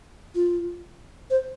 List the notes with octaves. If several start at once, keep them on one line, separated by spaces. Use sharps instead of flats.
F4
C5